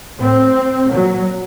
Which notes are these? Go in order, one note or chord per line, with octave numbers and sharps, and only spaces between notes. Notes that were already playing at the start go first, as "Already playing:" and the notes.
A2 C4
A#2 F#3